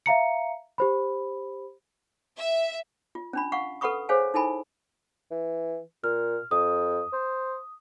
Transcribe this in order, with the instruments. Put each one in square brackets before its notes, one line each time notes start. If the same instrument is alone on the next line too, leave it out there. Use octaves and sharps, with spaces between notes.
[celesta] E5 F5 A#5 C#7
G4 C5 B5
[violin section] E5
[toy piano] F4
C#4 D4 B5
F5 F#5 C#6
A4 B4 F#5 B5 C#6 D#6
G#4 C5 C#5 F5 G#5
D#4 E4 A4 G#5 B5
[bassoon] E3
[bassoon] A#2 [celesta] F6
[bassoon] F2 [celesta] D#6
[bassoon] C5